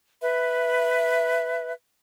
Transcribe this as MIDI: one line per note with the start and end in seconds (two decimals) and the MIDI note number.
0.21 1.72 71
0.21 1.72 76